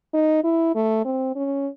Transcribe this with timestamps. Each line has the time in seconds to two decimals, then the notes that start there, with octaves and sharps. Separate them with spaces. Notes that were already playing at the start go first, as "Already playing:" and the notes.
0.14 D#4
0.44 E4
0.75 A3
1.05 C4
1.36 C#4